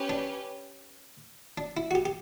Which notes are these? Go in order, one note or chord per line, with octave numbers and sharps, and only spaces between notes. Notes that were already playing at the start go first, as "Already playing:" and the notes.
Already playing: C#4 G4 B4
D4
D4
E4
F#4
G4
G4